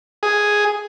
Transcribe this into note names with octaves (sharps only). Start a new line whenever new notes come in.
G#4